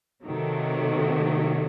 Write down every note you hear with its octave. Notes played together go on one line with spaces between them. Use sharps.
C3 D#3 F#3 A3